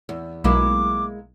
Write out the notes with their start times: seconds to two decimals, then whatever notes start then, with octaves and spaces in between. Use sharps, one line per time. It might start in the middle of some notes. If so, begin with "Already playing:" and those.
0.09 E2
0.44 B1 G#3 A#3 E4 D6